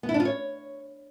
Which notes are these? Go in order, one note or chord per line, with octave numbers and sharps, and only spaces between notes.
B3
E4
D4
F4
C#5